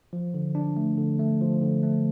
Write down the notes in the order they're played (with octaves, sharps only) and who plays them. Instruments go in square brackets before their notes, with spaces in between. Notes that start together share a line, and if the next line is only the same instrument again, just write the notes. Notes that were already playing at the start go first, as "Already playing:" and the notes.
[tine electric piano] F3
D3
D4
A3
D3
A3
F3
D3
A3